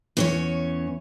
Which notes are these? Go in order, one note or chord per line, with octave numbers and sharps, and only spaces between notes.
E2 C#4 C#5